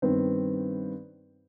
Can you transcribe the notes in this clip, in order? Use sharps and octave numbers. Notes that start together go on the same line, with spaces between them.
G2 D#3 B3 C4